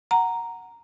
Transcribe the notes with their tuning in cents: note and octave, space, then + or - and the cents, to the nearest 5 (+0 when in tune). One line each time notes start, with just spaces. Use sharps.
F#5 +0 A#5 +0